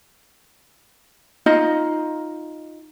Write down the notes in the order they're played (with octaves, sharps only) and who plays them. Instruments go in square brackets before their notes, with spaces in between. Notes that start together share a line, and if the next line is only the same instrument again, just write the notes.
[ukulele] D#4 F4 D#5